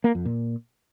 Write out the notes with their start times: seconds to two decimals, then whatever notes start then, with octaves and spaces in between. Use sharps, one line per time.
0.04 A#3
0.15 F2
0.25 A#2